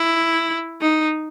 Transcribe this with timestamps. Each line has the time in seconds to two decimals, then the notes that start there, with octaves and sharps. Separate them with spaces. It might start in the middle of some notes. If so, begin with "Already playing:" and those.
Already playing: E4
0.82 D#4